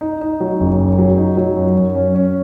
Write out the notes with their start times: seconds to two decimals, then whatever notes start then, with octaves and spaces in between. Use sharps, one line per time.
0.01 D#4
0.21 D#4
0.40 F#3
0.60 F#1
0.79 F#2
0.98 F#3
1.18 D#4
1.37 F#3
1.56 F#2
1.77 F#2
1.95 C#4
2.14 C#4